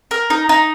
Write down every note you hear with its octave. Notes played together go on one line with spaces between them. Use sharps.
A#4
D#4
D#4